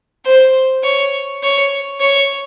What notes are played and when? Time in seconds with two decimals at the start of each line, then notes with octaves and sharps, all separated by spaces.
0.25 C5
0.83 C#5
1.42 C#5
2.00 C#5